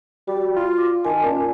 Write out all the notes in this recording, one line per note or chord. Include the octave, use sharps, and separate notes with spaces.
G3 F#4
F4
D6
D#3 G#5 A5
A#2 C#4